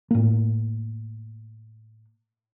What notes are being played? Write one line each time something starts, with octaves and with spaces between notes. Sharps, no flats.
A2 A#3